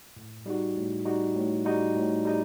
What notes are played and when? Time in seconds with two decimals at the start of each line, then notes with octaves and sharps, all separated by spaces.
0.16 A2
0.46 G3 D#4 F#4
0.76 A2
1.05 G3 D#4 F#4
1.35 A2
1.65 G3 D#4 F#4
1.95 A2
2.25 G3 D#4